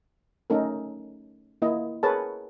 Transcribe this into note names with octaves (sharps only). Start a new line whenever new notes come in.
A3 C#4 D#4 A4 A#4
A#3 E4 D#5
G#4 A#4 B4 C#5 A5